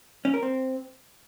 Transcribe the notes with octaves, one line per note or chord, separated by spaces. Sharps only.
C#4
A#4
C4